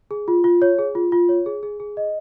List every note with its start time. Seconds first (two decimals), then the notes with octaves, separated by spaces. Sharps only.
0.11 G#4
0.28 F4
0.44 F4
0.62 C#5
0.79 G#4
0.95 F4
1.12 F4
1.29 C#5
1.46 G#4
1.63 G#4
1.80 G#4
1.97 D#5